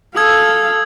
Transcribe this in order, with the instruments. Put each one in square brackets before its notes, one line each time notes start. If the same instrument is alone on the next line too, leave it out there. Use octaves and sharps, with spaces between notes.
[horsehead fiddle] A4 F5 [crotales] D#6 E6 G#6